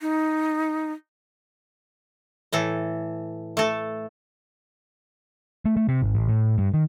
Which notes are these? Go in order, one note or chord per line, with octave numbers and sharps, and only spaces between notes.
D#4
A2 E3 A4
A3 A4
A3
A3
C3
G#1
A1
A2
G2
D#3